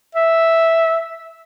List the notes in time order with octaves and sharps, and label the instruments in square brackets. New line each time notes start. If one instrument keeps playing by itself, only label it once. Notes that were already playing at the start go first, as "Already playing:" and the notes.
[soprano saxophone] E5